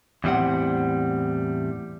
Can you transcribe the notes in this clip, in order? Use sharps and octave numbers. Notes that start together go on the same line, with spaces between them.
E2 A2 G3 C4 F#5